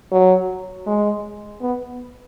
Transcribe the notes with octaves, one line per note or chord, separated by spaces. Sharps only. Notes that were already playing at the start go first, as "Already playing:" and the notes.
F#3
G#3
B3